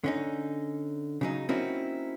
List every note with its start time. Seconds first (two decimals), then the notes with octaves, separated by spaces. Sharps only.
0.04 D3 C#4 D#4
1.21 C#3 F#3 D#4
1.49 A#3 C4 C#4 D#4 E4 F#4